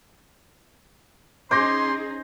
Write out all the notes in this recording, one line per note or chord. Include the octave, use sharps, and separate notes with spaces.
C#4 D#4 G#4 C5 C6 D6 G6 A#6